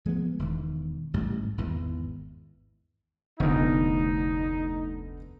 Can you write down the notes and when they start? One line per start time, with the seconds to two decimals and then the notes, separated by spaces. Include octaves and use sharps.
0.06 F3 G#3 A3 B3
0.39 E1 D#3
1.13 A1 G#2 G3
1.58 G#1 E2 E3
3.40 F1 D2 D3 B3 D#4